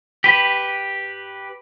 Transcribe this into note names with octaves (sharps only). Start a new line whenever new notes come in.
G4 B4